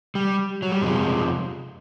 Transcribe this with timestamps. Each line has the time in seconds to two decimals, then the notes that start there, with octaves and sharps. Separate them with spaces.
0.15 G3
0.62 F#3
0.72 G3
0.82 F2 C3 F3 G#3